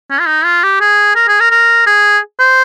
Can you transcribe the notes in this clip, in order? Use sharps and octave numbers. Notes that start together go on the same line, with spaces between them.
C#4
F4
D#4
F4
G4
G#4
A#4
G#4
A#4
A#4
G#4
C5